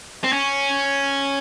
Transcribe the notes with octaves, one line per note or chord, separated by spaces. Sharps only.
C4
C#4